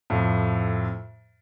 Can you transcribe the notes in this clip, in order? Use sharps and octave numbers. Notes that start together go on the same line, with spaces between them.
F2 A2